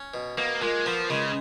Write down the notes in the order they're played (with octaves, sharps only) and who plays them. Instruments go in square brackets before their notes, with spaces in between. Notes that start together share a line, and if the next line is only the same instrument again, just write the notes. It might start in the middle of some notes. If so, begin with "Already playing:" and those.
Already playing: [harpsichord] C#4
B2
[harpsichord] B2 [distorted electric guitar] A#3
[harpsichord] A#2 [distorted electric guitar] G#3
[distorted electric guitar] F3 [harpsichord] B3
[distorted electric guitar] C#3 [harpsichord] G#3